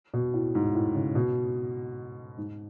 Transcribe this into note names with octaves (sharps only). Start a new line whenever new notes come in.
B2
A2
G#2
A2
C#3
B2
G#2